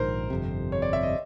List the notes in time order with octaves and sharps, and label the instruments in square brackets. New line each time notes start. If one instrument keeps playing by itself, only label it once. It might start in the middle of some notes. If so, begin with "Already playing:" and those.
Already playing: [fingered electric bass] A#1 G#2 D#3 [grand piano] A#4 C5
[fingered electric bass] G1 F2 C3
[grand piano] C#5
D5
E5
D#5